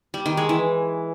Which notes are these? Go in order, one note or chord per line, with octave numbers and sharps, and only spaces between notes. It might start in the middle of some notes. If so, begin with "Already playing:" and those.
G3
D#3
G#3
E3